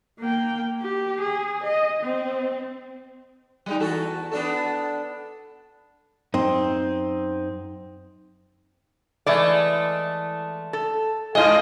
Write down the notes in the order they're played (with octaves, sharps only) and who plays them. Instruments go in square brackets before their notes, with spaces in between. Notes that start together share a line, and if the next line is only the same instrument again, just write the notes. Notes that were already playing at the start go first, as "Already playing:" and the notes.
[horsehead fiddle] A#3 G5
G4
G#4
D#5
C4
[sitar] G3 G#3 D#4
E2 F#4 A4
B3 D4 A4
[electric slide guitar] F#2 D#4 D#5 [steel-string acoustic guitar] C4
[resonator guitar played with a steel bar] E3 G#3 D5 [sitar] A3
[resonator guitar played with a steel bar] A4
[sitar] G#2 D#5 [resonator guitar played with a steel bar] G#3 F4